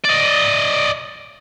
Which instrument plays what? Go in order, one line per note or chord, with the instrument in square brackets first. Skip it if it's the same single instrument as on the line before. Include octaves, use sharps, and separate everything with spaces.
[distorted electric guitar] D5 D#5